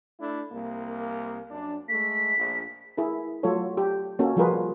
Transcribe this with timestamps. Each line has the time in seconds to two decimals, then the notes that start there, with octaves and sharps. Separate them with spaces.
0.19 A3 D4 E4
0.51 C2 A#3
1.49 F#2 D4
1.89 G#3 A3 B6
2.36 A#1
2.98 E4 G#4 A#4
3.43 F#3 A3 F4 A4 C#5
3.77 G4
4.19 A#3 C#4 F#4 A4
4.36 F3 G3 F4 G#4 A#4 B4